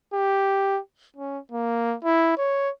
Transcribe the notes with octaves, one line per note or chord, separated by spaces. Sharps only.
G4
C#4
A#3
E4
C#5